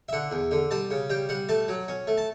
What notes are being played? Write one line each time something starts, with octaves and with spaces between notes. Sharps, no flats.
E5
D3 F#5
E2
D3
G3 A5
C#3
G3 G5
G3 F#5
A3 A5
F#3
C#4
A3
A5